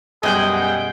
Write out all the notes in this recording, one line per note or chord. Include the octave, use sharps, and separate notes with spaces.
F#2 B2 G3 G#4 D#5 F#5 G5 G6